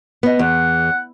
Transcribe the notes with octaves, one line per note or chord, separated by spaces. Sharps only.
B3 D#5
E2 F#5